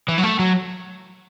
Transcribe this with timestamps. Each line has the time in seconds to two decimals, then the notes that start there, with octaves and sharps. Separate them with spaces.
0.08 E3
0.18 F#3
0.23 A3
0.39 F#3